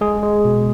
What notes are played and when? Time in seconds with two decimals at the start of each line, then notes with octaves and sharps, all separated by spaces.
0.01 G#3 G#4
0.23 G#3
0.45 B2